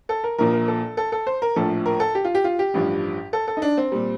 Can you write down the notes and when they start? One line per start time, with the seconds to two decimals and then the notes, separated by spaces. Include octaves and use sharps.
0.09 A4
0.24 A#4
0.38 A#1 A#2 F3 A#4
0.53 A#4
0.68 A4
0.97 A4
1.12 A4
1.27 C5
1.42 A#4
1.56 A#1 A2 F3 A4
1.86 A#4
2.00 A4
2.15 G4
2.24 F4
2.35 G4
2.44 F4
2.59 G4
2.74 A1 G2 F3
3.33 A4
3.48 A4
3.57 D#4
3.62 D4
3.77 C4
3.92 A#2 G3